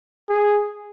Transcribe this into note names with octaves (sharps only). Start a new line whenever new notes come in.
G#4